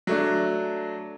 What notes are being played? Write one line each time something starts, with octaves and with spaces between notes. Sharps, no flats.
F#3 A3 D4